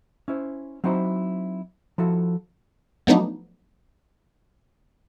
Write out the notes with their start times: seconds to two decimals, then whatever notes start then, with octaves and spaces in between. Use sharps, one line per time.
0.28 C#4 E4 C5
0.84 F#3 C4 D#4 E4 F#4 C5
1.98 F3 E4 F#4 A4
3.07 F3 F#3 A3 B3 D4 D#4